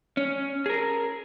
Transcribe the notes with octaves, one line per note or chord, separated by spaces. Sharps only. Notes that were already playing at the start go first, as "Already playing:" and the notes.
C#4
G#4 A#4